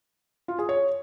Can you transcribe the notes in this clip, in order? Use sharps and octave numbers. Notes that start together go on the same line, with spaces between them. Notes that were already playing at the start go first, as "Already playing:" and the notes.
F4
G#4
C#5